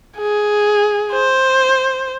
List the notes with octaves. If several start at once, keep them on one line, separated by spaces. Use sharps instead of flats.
G#4
C5